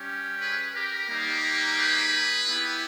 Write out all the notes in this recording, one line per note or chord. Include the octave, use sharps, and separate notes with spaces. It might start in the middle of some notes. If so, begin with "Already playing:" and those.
Already playing: G3 C#4 G4
G#4 B4
G4 A#4
G3 A#3 D#4 G4
G#4 B4
B3 E4 G4